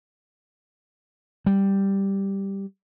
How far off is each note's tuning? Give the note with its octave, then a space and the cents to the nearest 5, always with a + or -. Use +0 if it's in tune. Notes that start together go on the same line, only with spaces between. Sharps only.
G3 +0